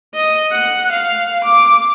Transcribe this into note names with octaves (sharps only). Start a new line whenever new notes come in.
D#5
F#5
F5
D6